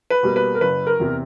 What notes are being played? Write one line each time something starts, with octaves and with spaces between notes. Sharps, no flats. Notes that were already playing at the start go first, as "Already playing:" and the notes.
B4
B2 G3 A#3
B4
A#4
F#1 B4
A#4
E2 C3